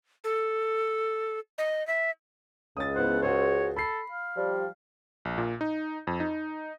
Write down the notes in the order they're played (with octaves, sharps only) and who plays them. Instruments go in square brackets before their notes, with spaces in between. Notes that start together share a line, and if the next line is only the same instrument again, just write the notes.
[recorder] A4
D#5
E5
[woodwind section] C#2 [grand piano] D#6 A6
[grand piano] B3 E4 C5 [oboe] F#5
[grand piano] F#4 G#4 C5 [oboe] C#5
[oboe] A4 [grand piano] B5 C7
[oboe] F5
[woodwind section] F3 G3
[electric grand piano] A#1
A#2
D#4
F2
D#4